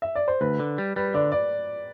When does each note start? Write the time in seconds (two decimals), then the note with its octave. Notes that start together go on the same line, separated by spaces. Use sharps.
0.02 E5
0.15 D5
0.28 C5
0.41 D2 B4
0.59 D3
0.78 G3
0.96 G3 B4
1.14 D3 D5
1.32 D5